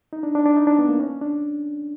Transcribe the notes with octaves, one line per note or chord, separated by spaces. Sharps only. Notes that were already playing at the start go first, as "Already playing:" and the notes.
D#4
D4
D4
D4
D#4
D4
B3
A#3
C#4
D4